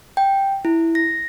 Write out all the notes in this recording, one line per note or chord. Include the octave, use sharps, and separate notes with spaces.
G5
E4
A#6